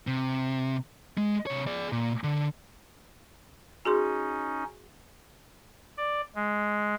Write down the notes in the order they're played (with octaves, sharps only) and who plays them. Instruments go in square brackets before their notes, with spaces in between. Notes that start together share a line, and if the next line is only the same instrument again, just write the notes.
[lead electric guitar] C3
G#3
C3 C#5
G#4 D5
A#2
D3
[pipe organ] C#4 D#4 [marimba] F#4 G#4 C6
[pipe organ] D5
G#3